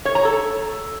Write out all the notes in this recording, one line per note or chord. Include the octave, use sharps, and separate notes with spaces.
C#5
A#5
A4